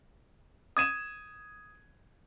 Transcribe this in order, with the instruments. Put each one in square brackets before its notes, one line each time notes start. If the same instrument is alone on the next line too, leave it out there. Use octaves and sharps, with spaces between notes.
[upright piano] D#6 G#6 D#7 E7